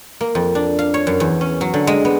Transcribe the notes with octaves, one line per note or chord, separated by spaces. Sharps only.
A#3
F2
D4
F5
C#5
F#2
E2
C#4
F#3
D3
G#3
B3